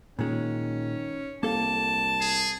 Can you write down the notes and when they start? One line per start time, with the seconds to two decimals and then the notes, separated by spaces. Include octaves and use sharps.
0.19 A#2 D#3 G#3 C#4
1.43 C2 A#3 A4 F5 A5
2.21 G#4